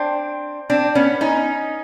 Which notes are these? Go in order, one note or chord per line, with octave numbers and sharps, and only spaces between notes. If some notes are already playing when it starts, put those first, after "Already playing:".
Already playing: C4 D4
C4 D4
B3 C#4
C#4 D#4